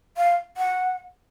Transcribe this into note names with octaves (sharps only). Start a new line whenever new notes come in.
F5
F#5